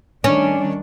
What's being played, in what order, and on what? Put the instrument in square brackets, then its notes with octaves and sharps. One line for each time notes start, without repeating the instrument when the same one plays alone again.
[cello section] D#3 G3 D4 [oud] C#4